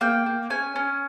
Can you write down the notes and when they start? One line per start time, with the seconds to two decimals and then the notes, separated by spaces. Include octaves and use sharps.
0.01 A#3 G5
0.26 A#3
0.50 C#4 G#5
0.76 C#4